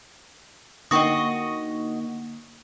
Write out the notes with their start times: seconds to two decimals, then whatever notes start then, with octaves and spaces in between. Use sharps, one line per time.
0.91 D3 A#3 D#4 F#4 D#5 G5 C#6 D#6